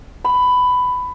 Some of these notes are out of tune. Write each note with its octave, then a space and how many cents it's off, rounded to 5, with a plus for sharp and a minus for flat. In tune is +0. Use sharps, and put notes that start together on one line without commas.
B5 +15